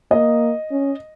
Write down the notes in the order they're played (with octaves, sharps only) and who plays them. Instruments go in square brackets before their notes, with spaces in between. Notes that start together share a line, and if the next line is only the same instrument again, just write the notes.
[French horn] A#3 [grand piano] D#5
[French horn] C#4